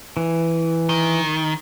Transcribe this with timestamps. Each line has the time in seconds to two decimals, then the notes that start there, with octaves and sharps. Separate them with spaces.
0.17 E3
0.89 D#3